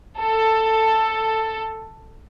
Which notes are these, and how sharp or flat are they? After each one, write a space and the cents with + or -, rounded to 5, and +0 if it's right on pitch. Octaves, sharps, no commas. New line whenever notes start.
A4 +10